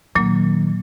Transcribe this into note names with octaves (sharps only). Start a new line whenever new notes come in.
A#2 D#3 F#3 A#3